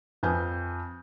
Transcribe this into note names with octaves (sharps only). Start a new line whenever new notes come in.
F2 B4 G#5 F6 G6